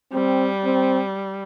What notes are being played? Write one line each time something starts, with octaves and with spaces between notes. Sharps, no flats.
G3 C4
C4